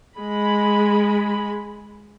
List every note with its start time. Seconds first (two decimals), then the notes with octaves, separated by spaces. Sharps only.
0.18 G#3 B5